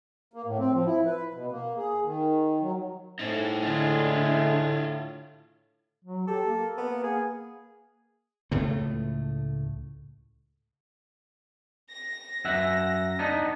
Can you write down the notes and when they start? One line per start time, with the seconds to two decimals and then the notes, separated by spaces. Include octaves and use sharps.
0.34 A#3
0.46 A2
0.58 C4
0.73 F3
0.86 E4
1.06 B4
1.35 B2
1.51 A#3
1.77 G#4
2.04 D#3
2.62 F#3
3.19 A2 D#4 C5
3.62 D3 G#3 E4 F4
6.05 F#3
6.27 G4 A4
6.44 A#3
6.77 B3
7.03 G#4
8.51 C#2 A2 A3
11.91 A#6
12.45 F#2 E5 F#5
13.19 B3 D4 D#4